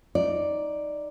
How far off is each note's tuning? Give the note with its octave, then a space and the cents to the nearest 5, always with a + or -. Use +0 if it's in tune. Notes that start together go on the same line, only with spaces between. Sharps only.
D#4 +5 D5 +0